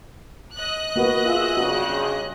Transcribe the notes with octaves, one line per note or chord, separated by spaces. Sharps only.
D#5 F#6
A#3 F#4 B4
F4 F#4 G#4 E5
G2 C#3 F#4